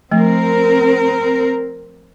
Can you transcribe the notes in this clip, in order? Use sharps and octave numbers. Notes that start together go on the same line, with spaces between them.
F3 A3 C4 A#4